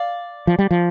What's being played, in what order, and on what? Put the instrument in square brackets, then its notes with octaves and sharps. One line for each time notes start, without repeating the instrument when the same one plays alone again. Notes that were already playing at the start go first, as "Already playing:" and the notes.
Already playing: [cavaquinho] D5 F5
[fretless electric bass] F3
G3
F3